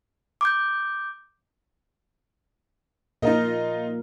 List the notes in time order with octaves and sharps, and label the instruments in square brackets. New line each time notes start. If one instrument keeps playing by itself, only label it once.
[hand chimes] D6 G6
[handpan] A#2 A#4 [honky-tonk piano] D#4 F4 D#5